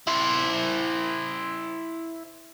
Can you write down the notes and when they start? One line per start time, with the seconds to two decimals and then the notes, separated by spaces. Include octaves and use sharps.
0.07 E4 C5